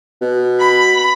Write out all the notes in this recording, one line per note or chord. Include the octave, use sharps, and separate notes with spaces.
B2
B5